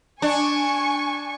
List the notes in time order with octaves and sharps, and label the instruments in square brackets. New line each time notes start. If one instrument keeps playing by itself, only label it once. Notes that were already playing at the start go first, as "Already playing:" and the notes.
[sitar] D4 [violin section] G#5 C#6